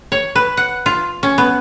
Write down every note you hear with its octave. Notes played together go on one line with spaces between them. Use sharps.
C#5
B4
F#5
F4
C#4
B3